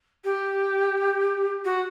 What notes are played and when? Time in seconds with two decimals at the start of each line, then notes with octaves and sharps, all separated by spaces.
0.24 G4
1.64 F#4